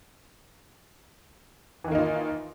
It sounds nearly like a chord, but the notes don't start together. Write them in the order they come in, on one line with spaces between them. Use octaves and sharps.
E3 D#3 A#3 D#4 F4